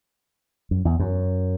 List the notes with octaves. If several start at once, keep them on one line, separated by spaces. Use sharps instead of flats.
F#2
E2
F#2